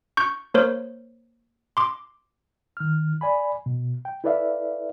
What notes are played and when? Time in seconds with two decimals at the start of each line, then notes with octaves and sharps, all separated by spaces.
0.17 C#6 G6
0.54 A#3 A#4 C5 C#5
1.77 C6 D6
2.77 D#3 F6
3.21 D5 G#5 B5
3.66 B2
4.05 G5
4.24 E4 A4 B4 D5 E5 F5